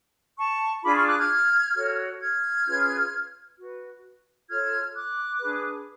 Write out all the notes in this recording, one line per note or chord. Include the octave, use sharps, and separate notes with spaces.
A5 C#6
D4 F4 G#4 B5 D6
C#6 F6
D6 F#6
F6 G#6
F#4 A4 C#5
F6 G#6
C#4 F4 G#4 B4
F#4 B4
F4 A4 C#5 F6 G#6
D6 F#6
D4 G#4 B4